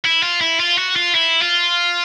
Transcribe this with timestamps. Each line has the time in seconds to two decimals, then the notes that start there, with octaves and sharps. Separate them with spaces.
0.05 E4
0.23 F4
0.41 E4
0.60 F4
0.78 F#4
0.96 F4
1.15 E4
1.42 F4